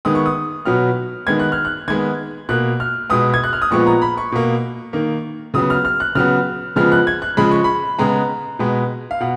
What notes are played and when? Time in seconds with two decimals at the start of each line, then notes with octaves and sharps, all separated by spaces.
0.05 D#3 G#3 B3 D#6
0.15 C#6
0.26 D#6
0.65 B2 F#3 B3 F6
1.27 D#3 G#3 B3 G#6
1.39 F#6
1.52 F6
1.65 F#6
1.88 D#3 G#3 B3 G#6
2.49 B2 A#3 F#6
2.80 F6
3.10 B2 G#3 B3 D#6
3.34 G#6
3.44 F#6
3.53 F6
3.62 D#6
3.71 A#2 F3 G#3 B3 C#6
3.87 A#5
4.02 B5
4.17 C#6
4.32 B2 A#3
4.93 D#3 A#3
5.54 C#3 F#3 B3 D#6
5.70 F6
5.85 F6
6.00 F#6
6.15 C#3 F#3 B3 F6
6.76 C#3 F3 G#3 B3 F6
6.92 F#6
7.07 G#6
7.22 F#6
7.37 C#3 F3 G#3 B5
7.51 C#6
7.64 B5
7.99 C#3 G#3 B3 A#5
8.59 B2 G#3 B3
9.11 F5
9.20 B2 F#5